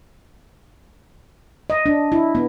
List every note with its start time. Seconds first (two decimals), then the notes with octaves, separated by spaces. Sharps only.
1.70 D#5
1.86 D4
2.12 E4
2.35 B3